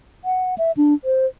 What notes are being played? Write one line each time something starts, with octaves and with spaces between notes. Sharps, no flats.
F#5
E5
D4
C5